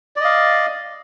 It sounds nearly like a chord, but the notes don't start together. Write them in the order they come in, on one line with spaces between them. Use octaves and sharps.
D5 D#5 F5